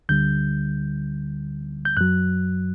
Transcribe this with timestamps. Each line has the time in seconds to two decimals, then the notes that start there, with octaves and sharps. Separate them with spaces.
0.09 D2 D3 G3 G6
1.85 G6
1.97 F#2 F#3 F#6